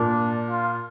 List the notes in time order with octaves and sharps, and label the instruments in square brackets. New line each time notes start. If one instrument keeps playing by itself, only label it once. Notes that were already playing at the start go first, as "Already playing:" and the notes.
Already playing: [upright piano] A#2 [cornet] D4
[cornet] F4